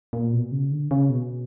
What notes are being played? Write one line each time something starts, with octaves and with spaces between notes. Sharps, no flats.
A#2
B2
C#3
D3
C#3
B2